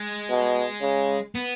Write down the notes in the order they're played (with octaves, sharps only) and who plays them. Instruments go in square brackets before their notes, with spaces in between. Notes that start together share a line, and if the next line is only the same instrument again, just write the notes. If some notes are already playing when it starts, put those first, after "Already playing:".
Already playing: [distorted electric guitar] G#3
[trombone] B2
C#3
[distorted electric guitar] B3